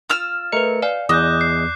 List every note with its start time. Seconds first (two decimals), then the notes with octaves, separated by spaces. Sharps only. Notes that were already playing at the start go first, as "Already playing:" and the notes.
0.10 F4 E6 F6
0.52 A3 A#4 B4 D#5 C#7
0.82 D5 F5 G#5
1.09 E2 D#5 D6 F#6 G6
1.41 C7